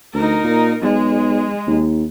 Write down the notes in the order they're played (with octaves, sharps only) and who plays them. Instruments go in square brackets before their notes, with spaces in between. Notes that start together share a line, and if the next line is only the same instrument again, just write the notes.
[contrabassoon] D2 [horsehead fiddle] D#4 A#4
[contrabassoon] A#2
[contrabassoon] B1 [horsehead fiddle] G#3
[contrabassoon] D#2